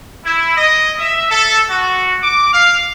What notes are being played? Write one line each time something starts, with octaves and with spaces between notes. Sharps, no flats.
E4
D#5
E5
A4
F#4
D6
F5